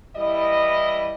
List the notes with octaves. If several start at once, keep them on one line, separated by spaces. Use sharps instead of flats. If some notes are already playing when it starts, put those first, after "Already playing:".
E3 G3 E4 D#5